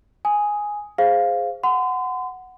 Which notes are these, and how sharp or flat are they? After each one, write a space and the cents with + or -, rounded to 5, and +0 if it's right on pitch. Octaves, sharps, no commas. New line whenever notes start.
G#5 +0 D#6 +10
G#4 +0 C5 +0 F5 +0
F#5 +0 C6 -40